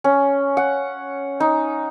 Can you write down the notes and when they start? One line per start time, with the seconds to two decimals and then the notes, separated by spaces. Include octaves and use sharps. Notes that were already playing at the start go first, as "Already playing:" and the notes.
0.04 C#4
0.57 F#5
1.40 D#4